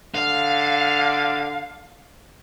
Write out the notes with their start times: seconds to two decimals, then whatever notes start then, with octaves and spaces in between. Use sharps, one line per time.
0.15 D3 F5